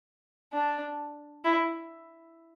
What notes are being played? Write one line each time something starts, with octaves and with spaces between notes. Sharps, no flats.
D4
E4